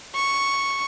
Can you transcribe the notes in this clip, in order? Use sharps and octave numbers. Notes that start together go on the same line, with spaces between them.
C#6